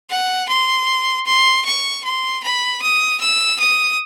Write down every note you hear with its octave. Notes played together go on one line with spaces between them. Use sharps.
F#5
C6
C6
C#6
C6
B5
D#6
E6
D#6